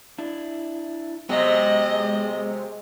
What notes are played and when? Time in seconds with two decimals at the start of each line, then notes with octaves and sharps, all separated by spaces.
0.18 D4 E4
1.29 C3 F#3 G#3 B3 D#5